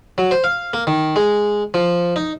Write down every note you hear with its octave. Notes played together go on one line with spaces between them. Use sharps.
F#3
C5
F5
A#3
D#3
G#3
F3
D#4